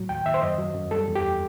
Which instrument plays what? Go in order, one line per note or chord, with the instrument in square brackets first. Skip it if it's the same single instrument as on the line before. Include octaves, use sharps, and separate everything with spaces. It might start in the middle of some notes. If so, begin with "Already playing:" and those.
Already playing: [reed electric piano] A2 F#3
D#2 G5
D#2 E5
C5
F#2 D#5
F#3
F#2
G3 A4
E2
G4